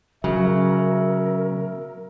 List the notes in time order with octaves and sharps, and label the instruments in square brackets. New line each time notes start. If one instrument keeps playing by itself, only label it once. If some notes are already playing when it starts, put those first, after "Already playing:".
[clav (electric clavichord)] C#3 [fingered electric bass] F#3 [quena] A#4 [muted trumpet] E5